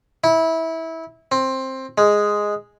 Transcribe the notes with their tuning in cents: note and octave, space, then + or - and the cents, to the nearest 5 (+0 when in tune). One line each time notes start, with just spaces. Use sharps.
E4 -20
C4 +15
G#3 +0